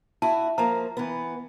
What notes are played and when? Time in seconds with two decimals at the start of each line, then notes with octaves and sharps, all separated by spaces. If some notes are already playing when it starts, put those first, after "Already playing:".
0.22 E4 F#4 A5
0.58 F3 A#3 A#5
0.97 E3 B3